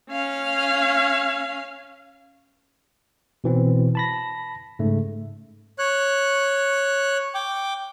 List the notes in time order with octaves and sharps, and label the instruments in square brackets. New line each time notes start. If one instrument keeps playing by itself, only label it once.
[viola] C#4 F5
[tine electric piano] B2 E3 C4
A5 B5 A#6
G#2 C#3 A3
[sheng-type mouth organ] C#5 F#6
G5 D6